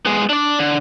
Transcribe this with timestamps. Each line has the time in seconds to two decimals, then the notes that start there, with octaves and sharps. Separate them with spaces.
0.05 G#3 B3
0.29 D4 D5
0.59 D3